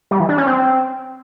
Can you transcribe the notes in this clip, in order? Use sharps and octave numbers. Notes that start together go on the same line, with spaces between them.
G3
E3
D4
C#4
C4